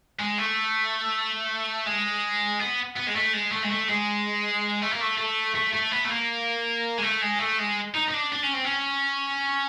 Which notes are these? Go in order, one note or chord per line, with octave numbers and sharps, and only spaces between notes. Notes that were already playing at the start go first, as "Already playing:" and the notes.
G#3
A3
G#3
B3
B3
G#3
A3
G#3
A3
G#3
A3
G#3
A3
A#3
A3
A3
A3
A3
B3
A3
A#3
G#3
A3
G#3
A3
G#3
D#4
D#4
D4
D4
C#4
C4
C#4